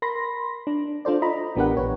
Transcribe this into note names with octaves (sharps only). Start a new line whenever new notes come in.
A#4 B5 C6 A#6
D4
D4 F4 A4 C5 D5
F4 D#5 A#5 B5
A1 B3 D4 G4 A#4 F#5
A#1 B4 C#5